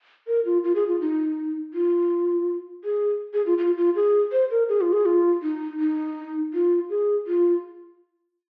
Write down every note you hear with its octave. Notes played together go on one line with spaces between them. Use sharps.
A#4
F4
F4
G#4
F4
D#4
F4
G#4
G#4
F4
F4
F4
G#4
C5
A#4
G#4
F4
G#4
F4
D#4
D#4
F4
G#4
F4